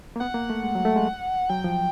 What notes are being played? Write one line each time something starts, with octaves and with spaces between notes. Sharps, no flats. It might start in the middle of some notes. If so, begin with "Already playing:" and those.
A#3
B3 F#5
A#3
A3
G#3
F#3
A3
G#3
F#3 G5
F3